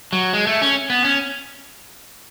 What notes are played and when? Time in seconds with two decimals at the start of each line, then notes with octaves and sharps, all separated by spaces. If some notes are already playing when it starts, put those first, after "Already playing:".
0.13 F#3
0.33 G#3
0.47 A3
0.62 C#4
0.90 B3
1.05 C#4